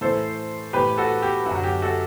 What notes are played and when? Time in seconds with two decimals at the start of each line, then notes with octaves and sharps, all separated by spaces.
0.01 A2 E3 A4 C5
0.73 A2 E3 G4 B4
0.98 F#4 A4
1.22 G4
1.46 F#2 D3 F#3 F#4
1.56 F#4
1.64 G4
1.82 F#4 A4